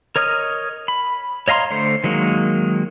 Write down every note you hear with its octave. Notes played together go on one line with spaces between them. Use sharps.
A#4 C#5 D#5 D#6 F6
B5
C#5 D#5 F5 A#5 C6
D3 A3 C5
D#3 F#3 G#3 A#3